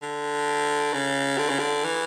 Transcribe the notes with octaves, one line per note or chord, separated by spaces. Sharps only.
D3
C#3
D3
C#3
D3
E3